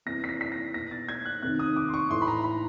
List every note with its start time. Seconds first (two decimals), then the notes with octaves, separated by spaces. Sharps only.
0.06 C3 E3 A#6
0.24 B6
0.29 A#6
0.41 B6
0.52 A#6
0.74 B2 A#6
0.91 A6
1.09 G#6
1.25 F#6
1.42 C3 D#3 F#6
1.59 D#6
1.76 D6
1.88 C6
1.94 C#6
2.10 A2 E3 C6
2.22 B5
2.28 A#5
2.44 B5